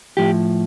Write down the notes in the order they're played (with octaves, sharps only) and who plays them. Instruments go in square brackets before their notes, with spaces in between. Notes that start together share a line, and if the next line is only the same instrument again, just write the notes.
[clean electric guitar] A2 F3 G4